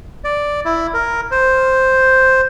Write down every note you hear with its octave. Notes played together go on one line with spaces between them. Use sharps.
D5
E4
A#4
C5